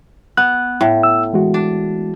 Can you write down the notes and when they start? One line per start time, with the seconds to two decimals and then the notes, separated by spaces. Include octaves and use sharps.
0.37 B3 F#6
0.81 A2
1.03 E6
1.33 E3 G#3 F#4
1.54 D4